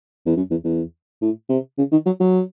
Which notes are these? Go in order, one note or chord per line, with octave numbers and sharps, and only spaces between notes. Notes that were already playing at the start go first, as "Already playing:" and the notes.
E2
F#2
E2
E2
A2
C3
C#3
D#3
F#3
F#3